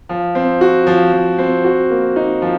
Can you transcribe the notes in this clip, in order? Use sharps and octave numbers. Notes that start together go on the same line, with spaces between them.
F3
C4
F#4
F3
F3
C4
F#4
A#3
D#4
F3